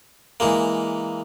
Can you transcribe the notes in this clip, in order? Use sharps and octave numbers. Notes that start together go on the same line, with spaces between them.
E3 G#3 A#3